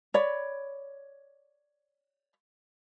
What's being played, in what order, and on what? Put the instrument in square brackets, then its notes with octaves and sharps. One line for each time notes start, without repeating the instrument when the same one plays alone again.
[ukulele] C#5 D5 B5